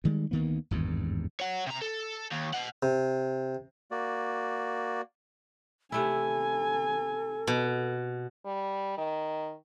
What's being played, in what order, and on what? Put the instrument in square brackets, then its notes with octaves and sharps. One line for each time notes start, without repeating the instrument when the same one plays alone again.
[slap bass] D2 D#3 G3 G#3
D2 D#3 A#3 B3
G#1 E2 G2
[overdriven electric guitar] C#5 F#5
C3 A#5
A4
D#2
D#5 F#5
[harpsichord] C3
[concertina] A#3 F#4 D5
[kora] C3 A3 E4 [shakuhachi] A4 [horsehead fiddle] G#5
[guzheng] B2
[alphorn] G3
D#3